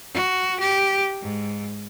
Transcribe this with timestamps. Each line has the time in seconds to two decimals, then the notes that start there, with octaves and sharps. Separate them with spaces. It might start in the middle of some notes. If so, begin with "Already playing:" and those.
0.14 F#4
0.60 G4
1.21 G#2